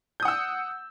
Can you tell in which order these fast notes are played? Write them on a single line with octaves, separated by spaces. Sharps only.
G6 D#6 F#5 E6